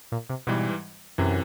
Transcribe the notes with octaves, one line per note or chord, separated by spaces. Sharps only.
A#2
C3
G#2 B2 E3 G3
F#2 C3 E3